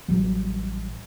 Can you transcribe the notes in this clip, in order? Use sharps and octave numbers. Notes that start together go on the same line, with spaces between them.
A1 F#3 G3